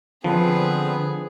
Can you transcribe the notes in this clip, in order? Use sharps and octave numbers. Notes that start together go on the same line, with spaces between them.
D3 F3 B3 C4 G#4 B4